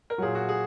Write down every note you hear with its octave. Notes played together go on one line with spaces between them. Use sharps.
A#4
A#2 F#3 G#4
F#4
G#4